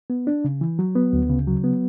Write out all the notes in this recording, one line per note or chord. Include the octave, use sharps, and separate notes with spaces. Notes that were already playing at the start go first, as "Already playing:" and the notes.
B3
D4
C#3
E3
F#3
B3
D2
C#3
F#3
B3